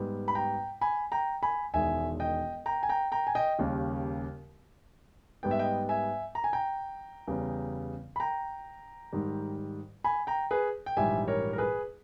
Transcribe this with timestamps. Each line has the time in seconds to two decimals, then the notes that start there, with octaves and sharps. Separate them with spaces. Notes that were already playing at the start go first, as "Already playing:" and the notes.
Already playing: G#2 G3 B3
0.28 B5
0.35 G5 A#5
0.81 G#5 B5
1.12 G5 A#5
1.43 G#5 B5
1.74 E1 E2 D#3 G#3 E5 G#5
2.20 D#5 G5
2.66 G5 A#5
2.83 G#5
2.89 G5 A#5
3.12 G5 A#5
3.27 G#5
3.35 D#5 G5
3.59 D#2 C#3 G3 A#3 C#4
5.43 G#2 G3 B3 G5
5.51 E5
5.59 D#5 G5
5.89 E5 G#5
6.35 A#5
6.44 G#5
6.53 G5 A#5
7.27 E2 C#3 G3 B3
8.16 B5
8.20 G5 A#5
9.13 G#2 D#3 G3
10.04 G#5 B5
10.27 G5 A#5
10.51 G#4 B4
10.86 G5
10.97 A#1 G#2 E3 G3 E5 G#5
11.28 A#4 C#5
11.53 A#4
11.58 G#4 B4